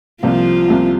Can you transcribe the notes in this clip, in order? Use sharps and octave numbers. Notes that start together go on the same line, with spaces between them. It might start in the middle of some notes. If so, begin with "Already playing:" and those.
C2 C3 F3 G3 A#3 F4
C2 C3 G3 A#3